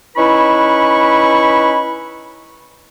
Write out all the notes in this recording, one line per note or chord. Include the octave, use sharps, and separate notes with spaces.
C#4 D#4 E4 B4 B5 C#6